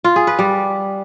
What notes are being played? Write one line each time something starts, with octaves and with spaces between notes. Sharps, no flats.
F4
G#4
B4
G3